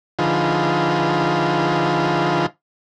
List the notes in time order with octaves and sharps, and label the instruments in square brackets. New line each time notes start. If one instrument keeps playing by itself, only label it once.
[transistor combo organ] D3 F3 D#4 F4 G#4 B4